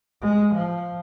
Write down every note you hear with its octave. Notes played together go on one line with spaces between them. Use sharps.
G#3
F3